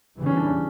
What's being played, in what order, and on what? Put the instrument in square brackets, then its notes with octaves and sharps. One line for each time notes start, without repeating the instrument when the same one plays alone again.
[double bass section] E2 C#3 E3 G3
[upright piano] C#4
D4
C#4